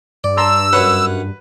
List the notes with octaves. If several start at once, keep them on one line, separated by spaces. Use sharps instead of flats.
G2 D5
A5 A#5 C6 E6
F#2 B4 C#5 F#5